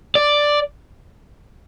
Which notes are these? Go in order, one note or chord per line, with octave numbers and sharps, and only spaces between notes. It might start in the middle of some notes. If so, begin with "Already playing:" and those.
D5